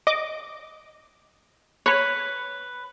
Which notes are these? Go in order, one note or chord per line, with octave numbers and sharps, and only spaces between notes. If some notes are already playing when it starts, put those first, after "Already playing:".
D#5 D6
B4 C#5 B5